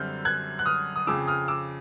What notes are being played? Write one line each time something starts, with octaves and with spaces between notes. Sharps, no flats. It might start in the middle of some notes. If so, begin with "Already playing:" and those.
Already playing: F#2 D3 G3 C4 F6 G6
F#6 G#6
F#6
D#6 F6
D#6
F2 C#3 F3 D6 E6
D#6 F6
D6 E6